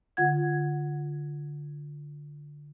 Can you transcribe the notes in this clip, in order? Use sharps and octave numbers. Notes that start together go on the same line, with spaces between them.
D3 F4 F#5 G#6